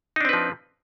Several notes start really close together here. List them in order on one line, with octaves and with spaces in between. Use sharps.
D#4 D4 C4 B4 F3